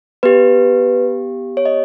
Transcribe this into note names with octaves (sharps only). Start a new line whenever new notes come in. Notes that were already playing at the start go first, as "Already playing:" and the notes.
B3 G4 B4
C#5
D#5